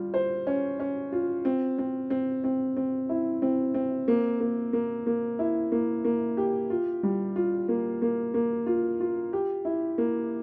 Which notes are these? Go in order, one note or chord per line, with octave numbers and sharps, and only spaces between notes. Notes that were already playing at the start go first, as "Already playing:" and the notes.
Already playing: G3 F4
C5
C#4
C#4
F4
C4
C4
C4
C4
C4
E4
C4
C4
A#3
A#3
A#3
A#3
E4
A#3
A#3
G4
F4
G3
F4
A#3
A#3
A#3
F4
F4
G4
E4
A#3